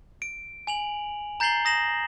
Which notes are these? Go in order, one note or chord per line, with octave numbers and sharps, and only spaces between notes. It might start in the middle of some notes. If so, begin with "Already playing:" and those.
D7
G#5 F7 F#7
A#5 G6 A6 C7 F#7 G7
D#6 A#6 E7 F#7